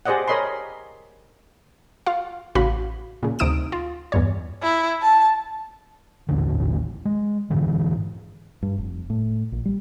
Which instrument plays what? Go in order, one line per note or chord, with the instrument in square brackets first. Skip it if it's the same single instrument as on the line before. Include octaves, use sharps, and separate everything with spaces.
[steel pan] G4 G#4 C5 D5 D#5 F#5
A#4 C#5 D#5 B5 C6
[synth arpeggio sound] F4 F5
A1 C#3 F#4 F5 B5
A#2 C#3
D2 C3 D#4 D#6 D7 E7
F4
E2 G2 C#5
[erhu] E4
A5
[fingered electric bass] D#1 A1 D#2 D3
G#3
G#2 D3 E3
G2
F1
A2
A#1
G3